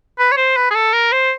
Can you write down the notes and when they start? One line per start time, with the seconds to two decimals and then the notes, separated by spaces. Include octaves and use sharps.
0.19 B4
0.32 C#5
0.37 C5
0.57 B4
0.71 G#4
0.75 A4
0.94 A#4
1.12 C5